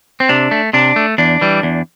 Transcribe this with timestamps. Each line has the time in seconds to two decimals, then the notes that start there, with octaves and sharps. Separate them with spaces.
0.20 C4
0.29 C3 D4
0.51 A3
0.73 C3 D4
0.96 A3
1.18 E2 D4
1.41 E3 G3
1.63 E2